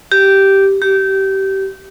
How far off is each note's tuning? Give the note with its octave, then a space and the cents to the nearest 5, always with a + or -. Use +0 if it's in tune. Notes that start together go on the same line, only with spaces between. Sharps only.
G4 -10
G4 -20